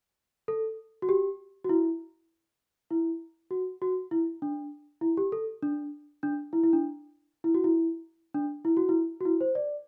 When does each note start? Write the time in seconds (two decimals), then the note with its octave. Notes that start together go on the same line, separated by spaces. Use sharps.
0.48 A4
1.02 F#4
1.09 G4
1.64 F#4
1.69 E4
2.90 E4
3.51 F#4
3.82 F#4
4.11 E4
4.42 D4
5.01 E4
5.17 G4
5.32 A4
5.63 D4
6.23 D4
6.53 E4
6.63 E4
6.73 D4
7.44 E4
7.54 F#4
7.64 E4
8.34 D4
8.65 E4
8.77 F#4
8.89 E4
9.21 F#4
9.25 E4
9.41 C5
9.55 D5